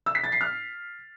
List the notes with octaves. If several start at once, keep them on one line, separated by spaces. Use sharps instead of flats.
E6
B6
A6
C7
F6